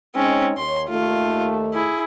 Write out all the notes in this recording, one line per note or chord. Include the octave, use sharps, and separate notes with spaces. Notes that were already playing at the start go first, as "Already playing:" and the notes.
G#3 C4 C#4 D#4 C#5
D#2 C#5 C6
D#2 A3 F4
E4 G#4